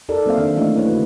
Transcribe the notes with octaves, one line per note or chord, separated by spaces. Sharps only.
D#4 G4 A4 A#4 D5
F#3 A#3 C4 C5 E5 F5
D#3 D4
E3 A3 A#3 C#4 E4 D#5
B4 C#5
D3 F#4